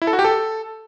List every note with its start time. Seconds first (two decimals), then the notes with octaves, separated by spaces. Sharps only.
0.02 E4
0.07 A4
0.13 F#4
0.19 G4
0.25 A4